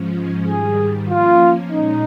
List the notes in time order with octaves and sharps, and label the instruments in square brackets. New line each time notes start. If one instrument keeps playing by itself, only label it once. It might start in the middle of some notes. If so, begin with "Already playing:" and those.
Already playing: [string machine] G#2 F3 G#3 C#4
[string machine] G#2 D#3 G3 [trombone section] G#4
[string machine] F3 A#3 C#4 [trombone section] F4
[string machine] A#2 G#3 C#4 [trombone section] D#4